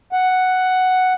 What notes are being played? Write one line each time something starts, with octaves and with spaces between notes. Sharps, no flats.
F#5